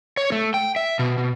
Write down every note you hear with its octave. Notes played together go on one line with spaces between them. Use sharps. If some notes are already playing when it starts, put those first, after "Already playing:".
C#5
A3
G5
E5
B2
B2